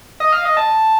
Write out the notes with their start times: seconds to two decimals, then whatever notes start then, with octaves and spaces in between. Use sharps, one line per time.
0.20 D#5
0.32 F5
0.45 D#5
0.57 A5